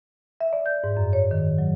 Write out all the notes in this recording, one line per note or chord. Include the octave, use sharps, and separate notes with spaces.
E5
D5
G6
G#2
F#2
C#5
D#3
F#3